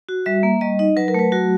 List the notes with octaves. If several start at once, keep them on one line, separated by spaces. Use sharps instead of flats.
F#4
G3 E5
A#3
G3 D#5
D#4 D#5
F#3 B4
A#4
A3 B4
F#3 F#4